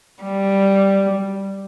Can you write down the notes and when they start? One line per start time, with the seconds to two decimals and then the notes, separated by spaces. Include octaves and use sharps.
0.23 G3